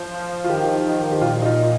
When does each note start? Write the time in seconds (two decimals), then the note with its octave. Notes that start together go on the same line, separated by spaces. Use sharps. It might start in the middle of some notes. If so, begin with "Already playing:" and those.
Already playing: F3 C5
0.14 F3
0.44 F4
0.49 D#3 G4
0.85 D#3
1.12 G4
1.21 A#2 F4
1.42 D#4
1.46 F4
1.58 A#2